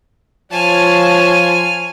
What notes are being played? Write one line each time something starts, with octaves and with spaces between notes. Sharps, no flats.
F3 C#5 G#5 A5 C6 F6